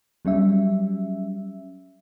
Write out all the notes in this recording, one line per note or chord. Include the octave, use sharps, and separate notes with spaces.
F#3 G3 C#4 E5